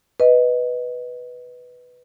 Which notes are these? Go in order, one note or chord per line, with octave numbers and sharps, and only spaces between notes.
B4 D#5